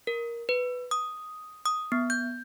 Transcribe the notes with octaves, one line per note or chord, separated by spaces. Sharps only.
A#4
B4
D#6
D#6
B3
G6